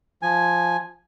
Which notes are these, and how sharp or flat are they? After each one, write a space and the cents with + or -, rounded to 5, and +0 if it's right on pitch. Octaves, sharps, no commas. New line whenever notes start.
F3 +0 G#5 +0